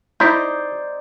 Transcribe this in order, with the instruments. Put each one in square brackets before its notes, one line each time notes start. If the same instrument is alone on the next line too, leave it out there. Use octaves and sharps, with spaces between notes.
[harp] D#4 C5 D5 [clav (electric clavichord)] E4 A#5 [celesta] G6